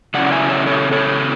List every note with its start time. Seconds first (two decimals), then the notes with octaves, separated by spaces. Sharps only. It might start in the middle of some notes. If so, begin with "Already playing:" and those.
0.14 C#3 F#3 C#4 E4 D5 F#5
0.26 F#5
0.31 E5 G#5
0.49 C#5 E5
0.66 A4 C#5
0.92 A4 C#5